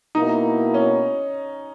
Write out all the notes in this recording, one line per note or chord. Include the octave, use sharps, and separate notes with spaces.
B2 A#3 D#4 E4
C#4